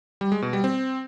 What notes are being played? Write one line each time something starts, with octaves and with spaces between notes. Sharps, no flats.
G3
G#3
B2
G3
C4